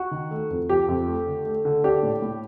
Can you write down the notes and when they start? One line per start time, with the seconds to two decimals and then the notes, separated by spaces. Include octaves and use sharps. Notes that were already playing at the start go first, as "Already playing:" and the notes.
Already playing: F#4
0.11 D#3
0.31 A3
0.50 F2
0.69 F3 G4
0.88 F2
1.08 A3
1.27 D3
1.46 A3
1.65 D3
1.84 D4 G4
2.03 A2
2.22 A2